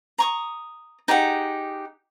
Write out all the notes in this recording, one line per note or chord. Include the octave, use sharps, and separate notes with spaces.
A#5 C#6 D#6
D#4 G4 G#4 F#5